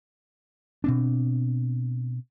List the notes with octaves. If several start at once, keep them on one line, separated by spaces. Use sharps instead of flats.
B2 C4 D4